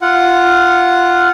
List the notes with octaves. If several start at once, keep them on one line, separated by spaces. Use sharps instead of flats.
F4 F#5